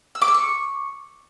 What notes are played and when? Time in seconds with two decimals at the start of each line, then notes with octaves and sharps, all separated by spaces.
0.15 E6
0.22 D6
0.28 E6
0.34 C#6